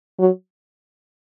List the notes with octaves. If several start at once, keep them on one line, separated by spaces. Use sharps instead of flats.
F#3